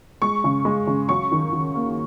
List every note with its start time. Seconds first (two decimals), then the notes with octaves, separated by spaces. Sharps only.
0.22 G#3 C#6
0.44 C#3
0.65 G#3
0.87 C#3
1.09 F#3 C#6
1.32 D#3
1.52 D#3
1.75 A#3